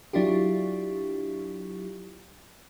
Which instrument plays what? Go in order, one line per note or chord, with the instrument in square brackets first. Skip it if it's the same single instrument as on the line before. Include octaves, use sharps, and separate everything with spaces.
[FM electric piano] F#3 D4 E4 F4 G4